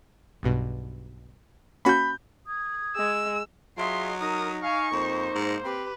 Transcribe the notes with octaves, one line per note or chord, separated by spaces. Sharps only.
B1 G2 B2
A#3 C#4 F#4 B5 G6
D#6 G#6
G#3 E6
F#3 F4 G#4 D#5 E5 C6
D#4 A#4 D#6
F5 G#5 C#6
F2 A#3 C5
G#2
C4 G4 B4